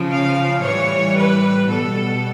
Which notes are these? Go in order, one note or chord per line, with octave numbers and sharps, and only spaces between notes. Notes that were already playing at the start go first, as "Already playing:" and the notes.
Already playing: C#3 F3
F5
A2 E3 G3 C#5
B4
B2 G3 A4